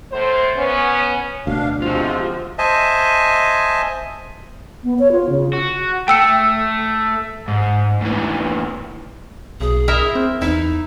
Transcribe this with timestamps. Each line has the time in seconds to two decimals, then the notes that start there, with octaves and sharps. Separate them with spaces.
0.12 A2 C5
0.57 B3 C#4
1.47 D2 B2 D4 F5
1.82 C3 F3 G#3 C4 F4 F#4
2.58 C5 D#5 E5 G#5 A5
4.84 B3
4.99 C#5
5.12 F4
5.30 C#3
5.53 F#4
6.08 A3 G5 E6 C#7
7.48 G#2
8.01 D2 E3
9.61 B1 G#4
9.88 E4 A#4 E5
10.15 C4
10.42 E2 D#4 E4